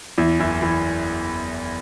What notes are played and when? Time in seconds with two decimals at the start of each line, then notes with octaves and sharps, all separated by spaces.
0.18 E2 E3 E4
0.40 F#1 E3 E4
0.62 E3 E4